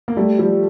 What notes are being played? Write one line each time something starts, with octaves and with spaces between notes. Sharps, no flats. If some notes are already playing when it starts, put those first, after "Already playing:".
A#3
G3 A3
F3 G3